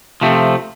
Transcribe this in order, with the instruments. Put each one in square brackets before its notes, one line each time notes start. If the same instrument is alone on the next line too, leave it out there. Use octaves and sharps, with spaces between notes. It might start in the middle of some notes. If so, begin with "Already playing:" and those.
[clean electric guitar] C3 F3 A3 C4